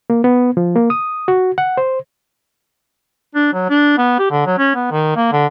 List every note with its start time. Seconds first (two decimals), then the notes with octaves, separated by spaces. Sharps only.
0.10 A#3
0.24 B3
0.57 F3
0.76 A#3
0.90 D#6
1.28 F#4
1.58 F#5
1.77 C5
3.35 D4
3.53 F#3
3.70 D4
3.98 B3
4.19 G4
4.31 D3
4.46 F#3
4.58 C#4
4.75 B3
4.91 D#3
5.16 A#3
5.32 D3